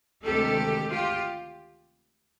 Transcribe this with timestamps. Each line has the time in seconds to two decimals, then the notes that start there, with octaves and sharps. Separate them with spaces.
0.25 D2 C3 D#3 G#3 G4 A4
0.89 F4 G4